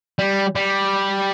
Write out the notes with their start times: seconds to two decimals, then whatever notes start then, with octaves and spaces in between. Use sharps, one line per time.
0.19 G3
0.55 G3